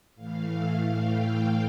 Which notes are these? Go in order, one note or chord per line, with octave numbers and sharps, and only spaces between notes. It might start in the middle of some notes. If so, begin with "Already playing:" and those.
A2 E3 A3 F5
G5